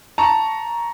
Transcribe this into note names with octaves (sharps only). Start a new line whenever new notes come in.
A5 A#5 C#6